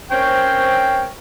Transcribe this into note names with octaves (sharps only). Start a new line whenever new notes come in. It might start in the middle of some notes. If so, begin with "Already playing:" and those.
C4 C#4 A#4 C5 C#5 G5